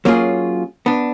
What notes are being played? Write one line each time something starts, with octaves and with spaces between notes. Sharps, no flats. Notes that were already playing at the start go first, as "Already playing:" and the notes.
F#3 A#3 C#4 F4 G#4
B3 D4